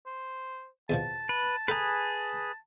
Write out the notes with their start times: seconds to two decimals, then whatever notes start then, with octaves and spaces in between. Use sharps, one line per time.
0.06 C5
0.90 E2 B2 F3 A5
1.29 B4
1.68 G#4 A4 B4 G5 A#5